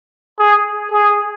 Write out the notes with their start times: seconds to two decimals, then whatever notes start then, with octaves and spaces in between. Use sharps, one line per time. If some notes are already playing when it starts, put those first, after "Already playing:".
0.39 G#4
0.90 G#4